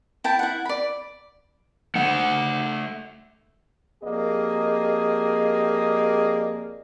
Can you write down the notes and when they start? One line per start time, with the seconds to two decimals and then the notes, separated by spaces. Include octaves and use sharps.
0.24 E4 G5 A5
0.39 E4 F#5
0.65 D5 B5
1.95 A3 F#5
4.03 F2 A#3 G4 G#4 D5 D#5